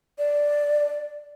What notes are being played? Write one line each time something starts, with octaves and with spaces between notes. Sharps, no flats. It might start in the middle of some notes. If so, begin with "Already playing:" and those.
D5